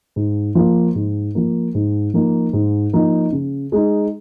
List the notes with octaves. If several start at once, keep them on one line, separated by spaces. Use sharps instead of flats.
G#2
F3 A#3
G#2
F3 A#3
G#2
F3 A#3 D#4
G#2
F3 A#3 D#4
C#3
G#3 D#4